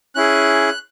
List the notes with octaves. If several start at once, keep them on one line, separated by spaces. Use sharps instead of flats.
C#4 E4 G#4 F#6